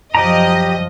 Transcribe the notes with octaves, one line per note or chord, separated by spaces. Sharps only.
F#2 F3 G4 D5 D#5 A#5